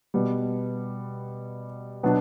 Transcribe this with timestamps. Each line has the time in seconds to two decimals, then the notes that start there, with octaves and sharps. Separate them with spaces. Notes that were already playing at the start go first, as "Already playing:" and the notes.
0.14 B2 G3 B3
2.03 B2 F#3 B3 D4